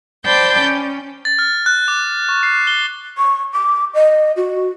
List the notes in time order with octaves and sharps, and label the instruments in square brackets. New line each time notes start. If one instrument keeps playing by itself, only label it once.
[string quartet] C5 D5 G5 A5 B5 G6
C#4
[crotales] A6
F6
F#6
D6
C#6
C7
G7
[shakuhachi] C#6
D6
D#5
F#4